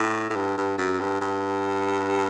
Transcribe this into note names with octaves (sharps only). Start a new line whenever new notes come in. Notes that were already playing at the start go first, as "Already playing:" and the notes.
Already playing: A2
A2
G2
G2
F#2
G2
G2